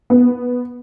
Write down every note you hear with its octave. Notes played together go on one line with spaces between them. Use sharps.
B3